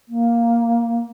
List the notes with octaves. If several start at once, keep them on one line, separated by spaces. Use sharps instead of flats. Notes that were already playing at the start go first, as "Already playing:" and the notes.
A#3